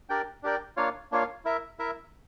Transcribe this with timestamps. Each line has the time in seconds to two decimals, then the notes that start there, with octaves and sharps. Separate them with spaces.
0.09 D4 G4 A#4 D5 G5
0.43 D4 G4 A#4 D5 G5
0.77 A#3 D4 F4 C#5 F5
1.12 A#3 D4 F4 C#5 F5
1.45 E4 A#4 E5
1.79 E4 A#4 E5